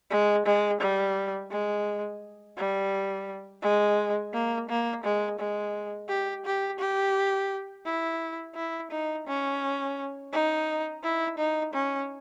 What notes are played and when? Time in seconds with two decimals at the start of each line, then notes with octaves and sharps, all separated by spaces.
0.11 G#3
0.46 G#3
0.81 G3
1.51 G#3
2.57 G3
3.62 G#3
4.33 A#3
4.69 A#3
5.04 G#3
5.39 G#3
6.09 G4
6.45 G4
6.79 G4
7.86 E4
8.56 E4
8.91 D#4
9.27 C#4
10.33 D#4
11.03 E4
11.38 D#4
11.74 C#4